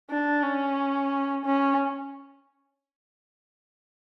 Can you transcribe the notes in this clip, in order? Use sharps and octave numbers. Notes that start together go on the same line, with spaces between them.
D4
C#4
C#4